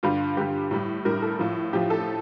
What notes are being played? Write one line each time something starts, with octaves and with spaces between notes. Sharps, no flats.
G2 D3 G3 F4
G2 D3 G3 G4
A2 G3
A2 G3 A#4
A4
A2 F3
A2 F3 G4
A4